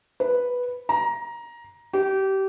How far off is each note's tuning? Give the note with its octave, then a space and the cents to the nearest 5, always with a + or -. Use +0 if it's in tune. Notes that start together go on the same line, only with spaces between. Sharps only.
B4 -5
A#5 +15
G4 -25